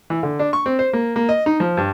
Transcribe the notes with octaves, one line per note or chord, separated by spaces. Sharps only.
E3
D3
D4
C#6
C4
C5
A#3
A#3
D#5
D#4
F3
G2